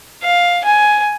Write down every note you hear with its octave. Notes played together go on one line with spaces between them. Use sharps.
F5
G#5